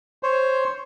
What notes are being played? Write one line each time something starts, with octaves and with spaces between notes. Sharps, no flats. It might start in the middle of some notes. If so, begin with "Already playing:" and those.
C5 C#5